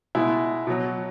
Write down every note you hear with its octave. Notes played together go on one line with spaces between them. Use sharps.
B2 G#3 E4
B2 F#3